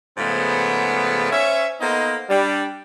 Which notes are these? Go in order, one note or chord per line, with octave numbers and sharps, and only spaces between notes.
G#2 C#3 F3 A3 B3
C#4 C5 C#5 E5
A#3 B3 D#4 A4 C5 D#5
G3 D4